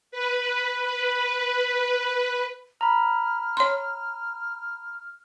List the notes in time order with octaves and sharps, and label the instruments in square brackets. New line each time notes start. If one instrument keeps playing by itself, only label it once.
[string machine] B4
B4
[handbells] A#5 B5 [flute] F6
[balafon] C#5 C6